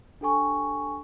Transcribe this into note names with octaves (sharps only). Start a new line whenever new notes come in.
D4 G4 A4 G5 G#5 C#6